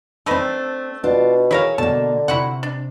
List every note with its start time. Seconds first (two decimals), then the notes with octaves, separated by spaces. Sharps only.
0.26 A3 C4 D4 D#4 B4
1.04 B2 D4 F4
1.51 E4 G#4 A#4 C#5 E5 F5
1.78 B2 D3 A#3 A5
2.28 C3 E4 F#4 F#5
2.63 D4